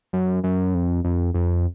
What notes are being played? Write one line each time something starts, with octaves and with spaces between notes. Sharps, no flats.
F#2
F#2
F2
F2
F2